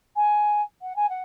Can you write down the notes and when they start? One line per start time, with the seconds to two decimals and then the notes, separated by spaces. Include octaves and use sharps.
0.16 G#5
0.82 F#5
0.96 G#5
1.09 F#5